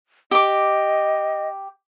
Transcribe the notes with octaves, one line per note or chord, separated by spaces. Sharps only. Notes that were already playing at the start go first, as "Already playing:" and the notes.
G4 D#5 D6